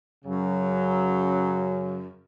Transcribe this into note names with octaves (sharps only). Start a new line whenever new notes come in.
F#2 C#3 F#3